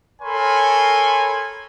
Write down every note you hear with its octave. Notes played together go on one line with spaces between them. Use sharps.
A4 A#4 C#5 G#5 B5 C6